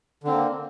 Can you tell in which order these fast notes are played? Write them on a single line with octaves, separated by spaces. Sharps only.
D3 C4 A#3